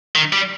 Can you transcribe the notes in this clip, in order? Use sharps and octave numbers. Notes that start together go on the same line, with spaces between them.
D#3
G3